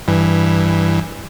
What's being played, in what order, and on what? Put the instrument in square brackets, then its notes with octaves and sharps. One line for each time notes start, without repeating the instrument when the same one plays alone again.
[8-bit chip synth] G2 E3